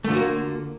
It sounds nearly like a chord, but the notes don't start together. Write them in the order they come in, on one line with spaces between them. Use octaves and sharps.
A3 D3 F4 F#4 A#3